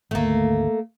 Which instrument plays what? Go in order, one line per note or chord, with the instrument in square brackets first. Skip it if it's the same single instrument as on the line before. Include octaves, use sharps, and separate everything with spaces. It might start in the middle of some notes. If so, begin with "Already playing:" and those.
[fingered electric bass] G#1 D2 [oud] A3 A#3